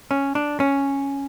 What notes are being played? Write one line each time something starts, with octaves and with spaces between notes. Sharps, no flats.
C#4
D4
C#4